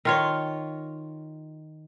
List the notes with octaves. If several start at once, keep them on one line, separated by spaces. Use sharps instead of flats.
D#3 F4 C#5